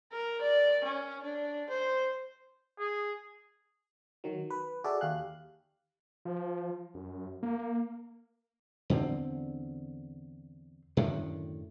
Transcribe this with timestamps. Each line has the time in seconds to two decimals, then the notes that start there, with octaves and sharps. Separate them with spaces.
0.12 A#4
0.42 D5
0.84 C#4
1.23 D4
1.70 C5
2.79 G#4
4.24 D#3 F#3
4.50 B4
4.84 F#4 G#4 A4 D5 E5
5.01 D#2 G4 F5 F#6
6.25 F3
6.94 F#2
7.43 A#3
8.90 E2 D3 B3 C4
10.97 F#2 A2 D3 D#3